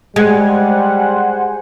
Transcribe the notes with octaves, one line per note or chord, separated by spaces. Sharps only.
G3 G#3 C5 F#5 G#5